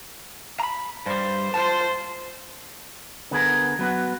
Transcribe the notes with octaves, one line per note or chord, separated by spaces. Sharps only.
A#5 B5
G2 G3 C5
F4 C5 A5
D3 B3 G#4 A#4
F#3 B3 F#4